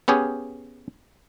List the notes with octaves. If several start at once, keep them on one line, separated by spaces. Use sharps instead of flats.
B3 C#4 G4 G#4